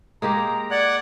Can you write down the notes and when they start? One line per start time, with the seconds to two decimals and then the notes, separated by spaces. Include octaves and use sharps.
0.22 G#3 A#3 G4 A#5
0.71 D5 F#5 F#6 G#6